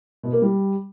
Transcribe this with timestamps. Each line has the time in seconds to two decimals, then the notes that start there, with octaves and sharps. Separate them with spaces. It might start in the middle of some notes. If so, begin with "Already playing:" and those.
0.23 B2
0.33 A#3
0.42 G3